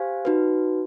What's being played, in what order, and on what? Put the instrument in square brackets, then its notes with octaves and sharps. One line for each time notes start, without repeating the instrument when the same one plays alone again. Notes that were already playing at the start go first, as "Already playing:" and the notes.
Already playing: [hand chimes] G4 C5 F5 G#5
D#4 F#4 B4